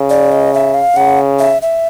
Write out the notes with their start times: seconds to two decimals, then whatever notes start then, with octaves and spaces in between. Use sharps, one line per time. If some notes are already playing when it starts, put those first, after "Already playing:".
Already playing: C#3
0.10 D5
0.32 D#5
0.54 E5
0.74 F5
0.96 C#3 F#5
1.39 E5
1.62 E5